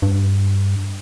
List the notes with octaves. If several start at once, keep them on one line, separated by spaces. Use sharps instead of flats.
G2